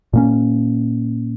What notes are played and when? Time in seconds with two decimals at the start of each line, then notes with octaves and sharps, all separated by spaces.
0.13 A#2 A#3 C#4